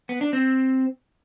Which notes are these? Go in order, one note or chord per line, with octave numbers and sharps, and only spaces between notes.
B3
D4
C4